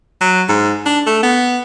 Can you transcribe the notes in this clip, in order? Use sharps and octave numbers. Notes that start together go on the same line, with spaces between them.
F#3
G#2
D4
A3
B3